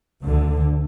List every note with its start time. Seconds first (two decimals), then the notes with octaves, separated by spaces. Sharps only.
0.24 D2 D3